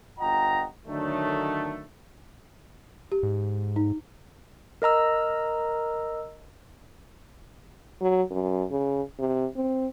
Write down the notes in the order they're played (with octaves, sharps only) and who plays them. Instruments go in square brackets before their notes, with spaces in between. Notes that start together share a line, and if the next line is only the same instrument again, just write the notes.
[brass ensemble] G1 F4 D#5 F#5 G5 A#5
D3 D#3 F#3 A3
[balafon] G4
[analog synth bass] G#2
[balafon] D#4
[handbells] A#4 D#5 A#5 E6
[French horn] F#3
F#2
C#3
C3
C4